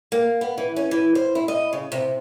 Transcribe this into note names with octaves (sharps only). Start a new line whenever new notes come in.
A#3
B3
E3
C#4
E3
C5
E4
D#5
C#3
C3